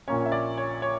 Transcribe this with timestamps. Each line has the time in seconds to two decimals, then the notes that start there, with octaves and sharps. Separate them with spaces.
0.08 A#1 A#2 A#3 C#4 C#5
0.26 E5
0.32 D5
0.57 C#5
0.82 C#5